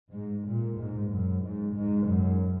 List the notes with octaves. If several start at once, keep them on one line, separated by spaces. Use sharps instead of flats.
G#2
A#2
G#2
F#2
G#2
G#2
F#2